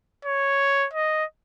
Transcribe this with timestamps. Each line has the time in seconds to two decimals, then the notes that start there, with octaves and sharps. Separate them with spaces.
0.25 C#5
0.93 D#5